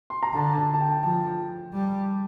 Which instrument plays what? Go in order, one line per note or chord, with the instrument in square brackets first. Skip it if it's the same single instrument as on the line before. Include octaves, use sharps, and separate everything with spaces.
[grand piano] C6
A#5
[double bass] D3 [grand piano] A5
[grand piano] A5
A5
G5
[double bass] F3 [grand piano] A5
[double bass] G3